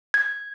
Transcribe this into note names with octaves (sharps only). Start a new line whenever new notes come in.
G#6